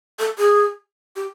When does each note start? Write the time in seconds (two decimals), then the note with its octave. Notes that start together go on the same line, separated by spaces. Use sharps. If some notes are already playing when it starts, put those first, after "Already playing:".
0.19 A4
0.38 G#4
1.16 G4